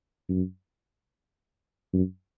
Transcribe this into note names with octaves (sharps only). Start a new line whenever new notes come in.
F#2
F#2